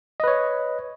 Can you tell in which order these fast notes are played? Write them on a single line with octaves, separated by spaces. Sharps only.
D#5 B4 C#5